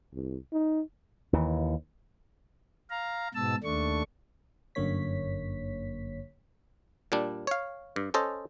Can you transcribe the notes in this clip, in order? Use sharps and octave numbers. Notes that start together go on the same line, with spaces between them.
C2
D#4
D#2 E3
F5 A#5
G#2 B2 A5 E6
D#2 A3 D4 C#6
G1 F#2 D3 A#3 C#5 B6
A#2 G3 D4
C#5 F5
G2
C#4 A4 C5 D#5